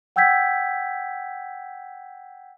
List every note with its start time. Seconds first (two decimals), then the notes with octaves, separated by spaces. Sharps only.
0.16 F#5 G5 E6 G6 G#6 B6